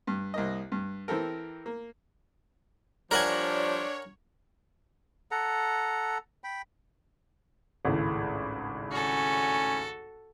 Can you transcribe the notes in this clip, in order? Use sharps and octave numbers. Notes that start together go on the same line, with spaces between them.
G2
C2 A#3 D#5
G2
E3 C4 G4 A4 A#4
A#3
F3 G3 D4 A#4 C5 C#5 F#5 G#5
A4 F#5 A#5
G5 B5
G#1 C#2 A2
C#4 F#4 A4